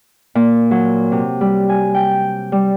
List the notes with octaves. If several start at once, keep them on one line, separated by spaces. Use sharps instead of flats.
A#2
F#3
C3
G3
G#5
G5
G3